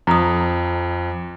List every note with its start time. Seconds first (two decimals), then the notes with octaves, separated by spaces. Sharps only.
0.07 F2 A#5 D#6